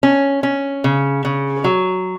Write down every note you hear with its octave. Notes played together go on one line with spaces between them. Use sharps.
C#4
C#4
C#3
C#3
F#3